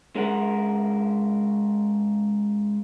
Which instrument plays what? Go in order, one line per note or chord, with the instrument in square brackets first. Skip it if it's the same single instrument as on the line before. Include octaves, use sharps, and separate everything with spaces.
[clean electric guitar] G#3 C#4 A#4 F#5